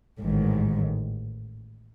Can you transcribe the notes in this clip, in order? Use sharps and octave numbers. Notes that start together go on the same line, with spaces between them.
A1 G#2 D#3